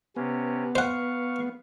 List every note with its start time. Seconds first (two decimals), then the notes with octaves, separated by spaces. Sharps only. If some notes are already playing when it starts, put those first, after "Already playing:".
0.16 C3 B3 C#4
0.75 C5 F5 F#5 C#6